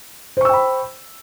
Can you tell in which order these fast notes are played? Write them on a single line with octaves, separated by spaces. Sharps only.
C5 C#6 E6 G5 B5